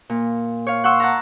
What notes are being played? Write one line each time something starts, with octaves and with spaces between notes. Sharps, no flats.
A#2
C#5 F5
F#5 C6 C#6 E6
F#5 A5 A#5